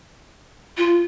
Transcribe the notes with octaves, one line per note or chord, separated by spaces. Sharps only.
F4